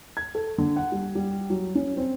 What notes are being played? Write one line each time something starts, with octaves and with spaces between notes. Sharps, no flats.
G#6
A4
D3
F#5
G3
G3
F#3
C#4
C4